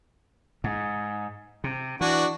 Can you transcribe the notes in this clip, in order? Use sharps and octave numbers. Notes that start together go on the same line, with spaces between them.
G#2
C3
E3 D4 F#4